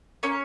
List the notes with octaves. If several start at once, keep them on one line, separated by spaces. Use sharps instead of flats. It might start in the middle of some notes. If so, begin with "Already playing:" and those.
A#3 C#4 C#5